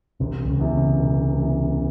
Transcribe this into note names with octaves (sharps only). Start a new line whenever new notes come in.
E1 C2 C3
C#2 C#3
E2 C3
C#2 C#3
E1
E2 C3